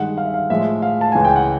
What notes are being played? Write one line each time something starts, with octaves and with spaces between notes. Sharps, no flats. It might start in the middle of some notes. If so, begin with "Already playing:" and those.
Already playing: G2 D#3 G#3 F#5
F5
E5
F5
A2 F3 G#3 E5
F5
A5
C#2 C#3 E3 G#5
G5
F#5